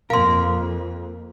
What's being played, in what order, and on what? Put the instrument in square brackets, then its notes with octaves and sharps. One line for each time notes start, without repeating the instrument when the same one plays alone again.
[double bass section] F2 [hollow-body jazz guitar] A#3 A#4 [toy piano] F5 C6